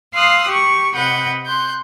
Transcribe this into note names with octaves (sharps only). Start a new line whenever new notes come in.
F5 C6 D#6 E6 F#6
G4 C#6
C3 B4 D#5 F#5 G6
C6 F#6 G6